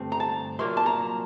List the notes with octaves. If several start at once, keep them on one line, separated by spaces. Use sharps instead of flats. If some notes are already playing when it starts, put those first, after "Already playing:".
Already playing: G2 D3 A3 C4
A#5
A5
C2 A#2 F#3 A#3 C6
A5
A#5